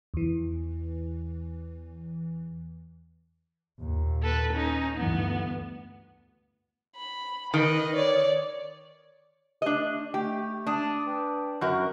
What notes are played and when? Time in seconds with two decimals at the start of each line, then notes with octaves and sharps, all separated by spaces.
0.14 E2 E3
3.80 D#2 A#2
4.23 A4 B4
4.53 C#4 D#4
4.96 D2 G2 E3 B3
6.96 B5
7.54 D#3 B4 D#5
7.96 C#5 D5
9.62 A3 D4 G4 D#5
10.14 A3 G4
10.67 D4 A5 D#6
11.06 B4 G5
11.61 F#2 F#4 A#4